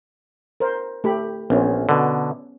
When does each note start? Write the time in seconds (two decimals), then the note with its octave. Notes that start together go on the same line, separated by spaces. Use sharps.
0.60 A#4 C5
1.04 A3 G4 B5
1.50 A#1 B3 C#4 C5
1.89 B2 D3